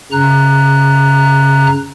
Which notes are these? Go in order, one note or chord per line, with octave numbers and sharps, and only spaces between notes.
F#2 C#3 A#5 F#6